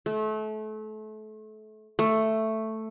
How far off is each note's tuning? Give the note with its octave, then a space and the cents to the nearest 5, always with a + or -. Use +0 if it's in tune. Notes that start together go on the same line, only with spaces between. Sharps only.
A3 -30
A3 +5